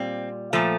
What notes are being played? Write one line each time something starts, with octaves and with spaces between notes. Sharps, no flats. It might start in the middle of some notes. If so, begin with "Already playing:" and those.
Already playing: A#2 G3 C4
A#2 F3 A3